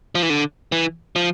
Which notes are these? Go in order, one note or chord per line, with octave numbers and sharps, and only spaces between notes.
F3
E3
D3
E3
F3